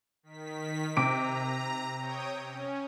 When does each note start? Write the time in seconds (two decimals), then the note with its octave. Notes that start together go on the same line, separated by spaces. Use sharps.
0.23 D#3 B6
0.97 C3 A#5 D6 D7
1.98 C#5 G5 D#6
2.43 C#4